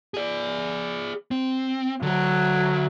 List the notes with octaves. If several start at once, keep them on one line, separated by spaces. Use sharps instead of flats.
G#4 D5
C4
D3 F#3 F#4